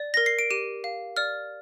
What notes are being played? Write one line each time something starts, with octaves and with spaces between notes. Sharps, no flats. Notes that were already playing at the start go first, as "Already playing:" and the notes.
Already playing: D5
A#4 A#6
C7
D7
G4 D#7
F5
D5 F6